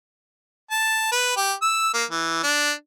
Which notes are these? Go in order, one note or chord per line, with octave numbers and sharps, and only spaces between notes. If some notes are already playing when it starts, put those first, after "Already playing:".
A5
B4
G4
E6
A#3
E3
D4